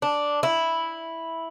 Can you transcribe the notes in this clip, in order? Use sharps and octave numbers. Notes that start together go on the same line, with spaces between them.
D4
E4